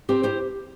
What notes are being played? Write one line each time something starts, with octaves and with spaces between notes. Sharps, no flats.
C4 G4 C5
E4 G4 C5